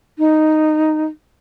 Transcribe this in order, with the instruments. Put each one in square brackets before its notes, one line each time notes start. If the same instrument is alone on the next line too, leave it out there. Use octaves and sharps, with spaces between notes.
[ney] D#4